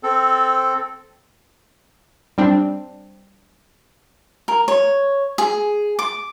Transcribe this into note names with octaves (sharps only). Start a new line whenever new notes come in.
C4 A4
G3 C4 D4
A#4
C#5
G#4
D6